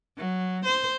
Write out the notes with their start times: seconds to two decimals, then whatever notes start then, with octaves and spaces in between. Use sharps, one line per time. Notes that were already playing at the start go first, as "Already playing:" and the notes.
0.17 F#3
0.65 C5